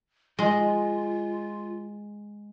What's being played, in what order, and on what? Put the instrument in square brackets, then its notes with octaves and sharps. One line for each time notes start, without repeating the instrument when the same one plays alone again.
[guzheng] G#3 [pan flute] F4